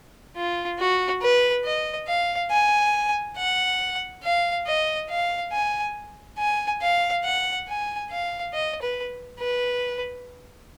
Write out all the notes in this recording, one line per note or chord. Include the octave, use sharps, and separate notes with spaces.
F4
F#4
B4
D#5
F5
G#5
F#5
F5
D#5
F5
G#5
G#5
F5
F#5
G#5
F5
D#5
B4
B4